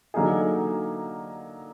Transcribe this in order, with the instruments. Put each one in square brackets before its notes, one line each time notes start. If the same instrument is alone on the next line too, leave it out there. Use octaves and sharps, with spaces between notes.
[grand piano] D3 F#3 A#3 D#4 G#4